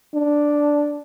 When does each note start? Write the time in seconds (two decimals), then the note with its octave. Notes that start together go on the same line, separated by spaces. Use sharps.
0.15 D4